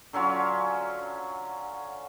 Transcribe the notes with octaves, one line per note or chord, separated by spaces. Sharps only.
D3 F#3 C#4 F4